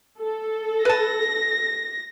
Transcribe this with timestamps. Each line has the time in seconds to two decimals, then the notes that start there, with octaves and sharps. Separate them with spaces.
0.19 A4
0.85 B4 A5 A#6